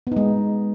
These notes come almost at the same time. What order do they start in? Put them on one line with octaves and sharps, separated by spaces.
B3 D#4 G#3